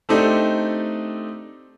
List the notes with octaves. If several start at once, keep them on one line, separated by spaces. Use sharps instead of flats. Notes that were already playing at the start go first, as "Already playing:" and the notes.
A3 C4 D4 D#4 G4 A4